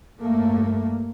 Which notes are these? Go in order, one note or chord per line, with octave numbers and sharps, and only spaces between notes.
G2 A3 A#3